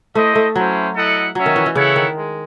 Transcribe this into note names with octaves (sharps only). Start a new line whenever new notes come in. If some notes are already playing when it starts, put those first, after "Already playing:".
A3 E4 C5 D#5
A3
F#3 C#4 E4 C5
E4 A4 D#5 F#5
F#3 C#4 F#4 C#5 E5
D#3
E3
E3
C#3 E4 A4 C#5 F#5
D#3
G#3